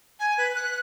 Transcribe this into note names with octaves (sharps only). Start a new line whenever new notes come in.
G#5
B4
F#6